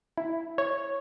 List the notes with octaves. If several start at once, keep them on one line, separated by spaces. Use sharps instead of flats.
E4
C#5